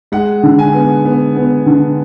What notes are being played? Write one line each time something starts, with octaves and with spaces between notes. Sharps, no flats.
G#3 F#5
D3
G#5
B3
B3
B3
D3